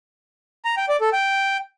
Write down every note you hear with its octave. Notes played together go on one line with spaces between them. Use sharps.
A#5
G5
D5
A4
G5